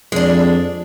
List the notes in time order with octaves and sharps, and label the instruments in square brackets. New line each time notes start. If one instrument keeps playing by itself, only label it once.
[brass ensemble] F2 [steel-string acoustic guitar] G#3 D4